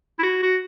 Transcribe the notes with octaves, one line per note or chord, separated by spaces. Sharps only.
E4
F#4
F#4